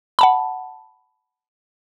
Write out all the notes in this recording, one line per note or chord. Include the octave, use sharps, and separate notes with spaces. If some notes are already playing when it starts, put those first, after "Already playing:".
F#5 A5 B5